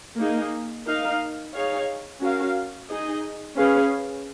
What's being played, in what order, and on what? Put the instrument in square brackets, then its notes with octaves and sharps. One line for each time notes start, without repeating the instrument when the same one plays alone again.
[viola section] A#3 D#4 G#4
D#4 A#4 F5
D#4 G#4 C#5 F5
C#4 F#4 A#4 F5
D#4 G#4 D#5
C#4 G#4 B4 F5